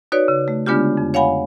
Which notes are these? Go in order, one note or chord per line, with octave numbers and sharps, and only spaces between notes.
D#4 F#4 B4 C#5 D5
C#3
A3
D3 G#3 B3 D4 F4 G4
F2
C#5 F5 F#5 G#5 B5